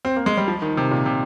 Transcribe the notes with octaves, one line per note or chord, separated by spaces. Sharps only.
C4
A#3
G#3
G3
F3
D#3
C3
A#2
C3